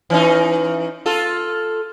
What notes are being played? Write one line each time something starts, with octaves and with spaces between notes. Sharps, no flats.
E3 C#4 D#4
F4 A4